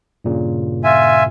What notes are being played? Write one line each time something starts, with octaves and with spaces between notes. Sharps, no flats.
G2 A#2 C#3
F4 E5 G#5